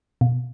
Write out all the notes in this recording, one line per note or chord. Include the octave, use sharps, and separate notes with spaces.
B2